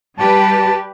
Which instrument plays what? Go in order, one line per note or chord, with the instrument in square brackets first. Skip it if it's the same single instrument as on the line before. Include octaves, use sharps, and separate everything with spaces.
[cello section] G3 G4 B4 [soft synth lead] A5